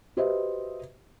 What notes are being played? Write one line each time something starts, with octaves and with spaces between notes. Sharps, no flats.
F#4 G4 B4 C5 D#5 E5